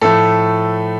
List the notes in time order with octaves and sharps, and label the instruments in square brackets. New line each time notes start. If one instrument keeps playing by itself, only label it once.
[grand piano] A2 F3 A3 A4